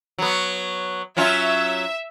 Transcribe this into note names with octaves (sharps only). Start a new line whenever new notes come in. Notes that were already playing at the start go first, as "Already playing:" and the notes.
F#3 B3
F#3 C#4 F4 E5